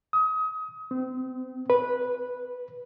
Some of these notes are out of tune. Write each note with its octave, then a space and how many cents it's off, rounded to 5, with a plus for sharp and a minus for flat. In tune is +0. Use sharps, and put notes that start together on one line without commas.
D#6 +30
C4 -30
B4 -10